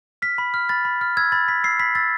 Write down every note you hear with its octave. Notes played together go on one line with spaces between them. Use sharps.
F6 B6
B5
F6
B5 A6
B5
F6
E6 G#6
B5 A6
B5 B6
E6 C7
B5 B6
E6 A6